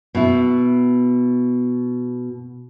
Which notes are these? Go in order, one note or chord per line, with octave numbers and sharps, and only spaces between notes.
B2 E4